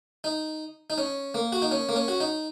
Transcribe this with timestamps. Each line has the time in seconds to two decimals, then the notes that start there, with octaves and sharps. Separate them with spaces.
0.24 D#4
0.90 D#4
0.98 C#4
1.35 A#3
1.52 F#4
1.62 D#4
1.71 C#4
1.89 A#3
1.96 C#4
2.08 F#4
2.20 D#4